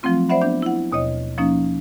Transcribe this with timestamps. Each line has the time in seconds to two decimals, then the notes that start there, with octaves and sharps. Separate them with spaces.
0.03 F3 F#3 A3 C4 F4
0.29 C5 D5 E5 F#5 B5
0.42 B3 D4 G6
0.62 E4 F#5
0.92 D#2 B2 C#5 D#5
1.38 F3 A#3 C#4 D#4